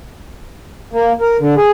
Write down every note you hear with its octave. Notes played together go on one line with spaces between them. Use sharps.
A#3
A#4
D3
G#4